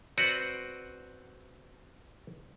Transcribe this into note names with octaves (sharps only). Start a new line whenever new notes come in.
C4 F#4 B4 D5 F#5